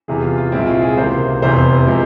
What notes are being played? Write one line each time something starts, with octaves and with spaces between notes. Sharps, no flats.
E2 C3 E3 G#4
F4
F4
C2 A#2 G#3 C4 E4
F4
G#4
C#2 C3 E3 A#3 C5
F1 E2 C3 E3 C5
C3 F3 G#3